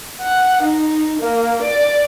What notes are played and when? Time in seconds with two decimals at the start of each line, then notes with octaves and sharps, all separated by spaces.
0.22 F#5
0.63 D#4
1.19 A#3
1.62 D5